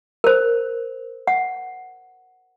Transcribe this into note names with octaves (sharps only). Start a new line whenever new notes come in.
A#4 C5
F#5